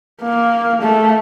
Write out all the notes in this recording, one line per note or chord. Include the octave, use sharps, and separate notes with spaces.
A#3
A3